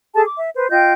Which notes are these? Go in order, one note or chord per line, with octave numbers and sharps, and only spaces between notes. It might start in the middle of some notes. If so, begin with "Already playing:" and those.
G#4 A4 A5
D6
E5
B4 C5
F4 D#5 G5 G6